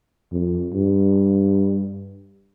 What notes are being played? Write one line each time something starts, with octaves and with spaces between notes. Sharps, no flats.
F2
G2